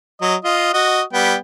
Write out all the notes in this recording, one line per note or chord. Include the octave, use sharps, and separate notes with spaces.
F#3 D#5
F4 D#5
F#4 D#5
G3 B3 G5